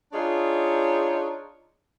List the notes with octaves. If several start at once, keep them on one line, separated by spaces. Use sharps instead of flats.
D4 D#4 F4 G#4 C#5